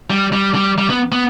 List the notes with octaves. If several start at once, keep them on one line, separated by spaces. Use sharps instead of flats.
G3
G3
G3
G3
B3
B3